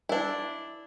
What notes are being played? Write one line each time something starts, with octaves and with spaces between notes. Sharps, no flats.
D4 E4